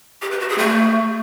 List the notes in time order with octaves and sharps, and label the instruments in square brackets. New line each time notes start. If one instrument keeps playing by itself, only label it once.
[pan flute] G4
B4
F#4
G#4
A3